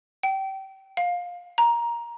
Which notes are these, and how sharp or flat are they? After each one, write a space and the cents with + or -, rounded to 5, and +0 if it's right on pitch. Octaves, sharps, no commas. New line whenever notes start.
G5 -25
F5 +20
A#5 +15